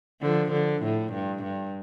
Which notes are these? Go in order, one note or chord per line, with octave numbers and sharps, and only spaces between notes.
D3 F3
D3
A2
G2
G2